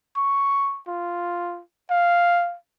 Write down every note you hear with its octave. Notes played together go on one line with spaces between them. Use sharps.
C#6
F4
F5